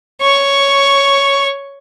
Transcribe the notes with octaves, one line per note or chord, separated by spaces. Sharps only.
C#5 C#6